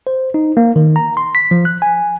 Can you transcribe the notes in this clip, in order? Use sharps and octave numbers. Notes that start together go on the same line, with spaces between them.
C5
D#4
A#3
D#3
A#5
C6
B6
F3
F#6
G#5